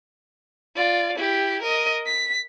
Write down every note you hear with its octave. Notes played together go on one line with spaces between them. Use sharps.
F4 D5
E4 G4
A#4 D#5
B6